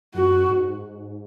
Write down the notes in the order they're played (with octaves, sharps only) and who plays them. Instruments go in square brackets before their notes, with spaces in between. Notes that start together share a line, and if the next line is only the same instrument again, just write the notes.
[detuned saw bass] F#2 [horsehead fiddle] F#4
[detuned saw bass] G#2